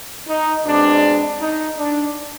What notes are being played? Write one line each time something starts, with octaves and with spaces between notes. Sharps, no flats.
D#4
B2 G#3 C4 D4
D#4
D4